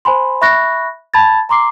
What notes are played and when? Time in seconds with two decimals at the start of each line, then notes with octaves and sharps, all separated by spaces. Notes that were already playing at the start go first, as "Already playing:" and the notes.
0.05 C5 G#5 B5 C6
0.41 E5 B5 C#6 F#6 A#6
1.14 A5 B5 G#6 A6
1.49 A#5 C6 D6 C7